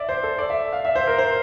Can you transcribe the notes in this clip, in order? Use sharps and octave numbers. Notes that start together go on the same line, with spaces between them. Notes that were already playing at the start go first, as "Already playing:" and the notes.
Already playing: D5 E5
C5
A4
D5
E5
F5
E5
C5
A#4
C5